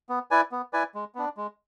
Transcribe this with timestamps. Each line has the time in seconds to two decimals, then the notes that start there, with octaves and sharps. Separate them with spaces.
0.09 B3
0.31 E4 B4 D5 G#5
0.52 B3
0.73 E4 B4 D5 G#5
0.95 G#3
1.15 B3 D4
1.37 G#3